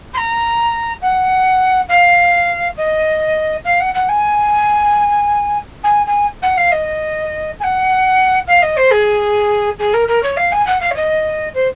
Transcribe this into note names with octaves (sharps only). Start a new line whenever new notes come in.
C6
A#5
F#5
F5
D#5
F5
F#5
F#5
G#5
G#5
G#5
F#5
F5
D#5
G#5
F#5
F5
D#5
C5
G#4
G#4
A#4
A#4
C#5
F5
G#5
F#5
F5
C#5
D#5
C5